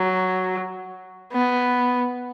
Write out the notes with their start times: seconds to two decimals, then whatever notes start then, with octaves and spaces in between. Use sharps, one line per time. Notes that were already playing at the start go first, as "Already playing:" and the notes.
Already playing: F#3
1.32 B3